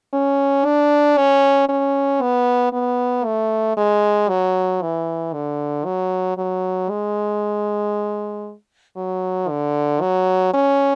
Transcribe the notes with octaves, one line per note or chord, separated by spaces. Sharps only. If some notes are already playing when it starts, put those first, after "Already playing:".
C#4
D4
C#4
C#4
B3
B3
A3
G#3
F#3
E3
D3
F#3
F#3
G#3
F#3
D3
F#3
C#4